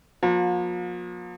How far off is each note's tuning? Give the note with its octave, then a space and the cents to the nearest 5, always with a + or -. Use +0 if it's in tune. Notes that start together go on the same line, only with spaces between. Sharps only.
F3 +40 A#3 +45